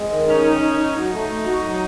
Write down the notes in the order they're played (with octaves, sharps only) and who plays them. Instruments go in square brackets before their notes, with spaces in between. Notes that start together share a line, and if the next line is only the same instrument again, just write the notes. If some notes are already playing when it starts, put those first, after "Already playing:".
Already playing: [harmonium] G#3 [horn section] C4
[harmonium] D#3
[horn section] C#4 [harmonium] D#4
[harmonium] D#4
D#4
D#4
[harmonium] F#3 [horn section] D#4
[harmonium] A3
A3
F#4
F#3